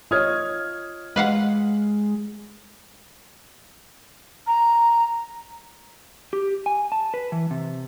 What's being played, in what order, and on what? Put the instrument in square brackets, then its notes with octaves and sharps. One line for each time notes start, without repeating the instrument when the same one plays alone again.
[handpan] F4 C#5 D#5 [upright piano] D#6 F6 G#6
[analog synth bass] G#3 [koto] B4 F5 F#5
[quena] A#5
[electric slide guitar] G4
G#5
A5
B4
E3
C3